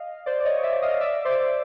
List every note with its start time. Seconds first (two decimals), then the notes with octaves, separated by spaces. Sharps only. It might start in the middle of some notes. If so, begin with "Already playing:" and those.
Already playing: D#5 F5
0.26 C5 D5
0.40 D5
0.45 C#5 D#5
0.63 D5 E5
0.82 D#5 F5
1.01 D5 E5
1.25 C5 D5